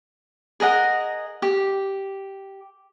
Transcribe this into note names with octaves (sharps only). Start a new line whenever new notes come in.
G#4 A#4 D#5 F#5
G4